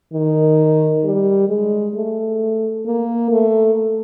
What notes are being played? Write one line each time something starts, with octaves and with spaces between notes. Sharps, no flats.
D#3
G3
G#3
A3
A#3
A3